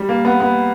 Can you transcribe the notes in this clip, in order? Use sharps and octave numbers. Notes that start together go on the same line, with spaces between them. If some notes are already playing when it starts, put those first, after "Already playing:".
Already playing: G3
A#3
B3
B3